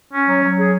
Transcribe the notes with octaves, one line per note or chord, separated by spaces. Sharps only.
C#4
F#3
F#3
G#4